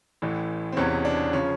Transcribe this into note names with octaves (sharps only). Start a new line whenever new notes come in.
A1 A2 E3
C4
E1 E2 C3 E3 C#4
D4
C#3 F3 C#4